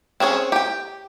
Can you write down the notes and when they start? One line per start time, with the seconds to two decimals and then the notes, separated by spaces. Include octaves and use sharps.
0.20 C4 C#4 G#4 C#5
0.52 G4 G5